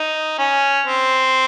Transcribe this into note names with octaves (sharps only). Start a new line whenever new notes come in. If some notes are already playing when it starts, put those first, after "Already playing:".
Already playing: D#4
C#4
C4